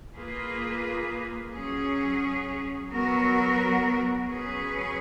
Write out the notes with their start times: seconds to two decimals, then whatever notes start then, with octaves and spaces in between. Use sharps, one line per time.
0.15 A#3 F4 G#4 B4
1.53 F#3 C#4 G#4
2.89 F#3 B3 F#4 A#4
4.26 F#3 C#4 G#4 B4